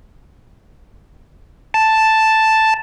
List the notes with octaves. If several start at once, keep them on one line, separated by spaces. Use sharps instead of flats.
A5